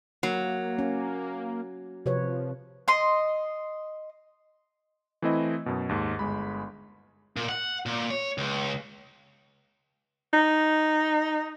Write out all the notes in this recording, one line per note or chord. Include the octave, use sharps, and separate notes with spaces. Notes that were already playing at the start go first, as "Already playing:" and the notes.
F#3 A#3
C#4
C3 F3 B4 C#5
D#5 C6
E3 A3 C4 E4 D#5
F#2 B2
D#2 G#2
G1 G#3 B5
A#2
F#5
A#2
C#5
C#2
D#4